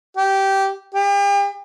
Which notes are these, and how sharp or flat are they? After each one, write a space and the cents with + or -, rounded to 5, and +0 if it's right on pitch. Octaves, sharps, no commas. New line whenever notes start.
G4 -15
G4 +40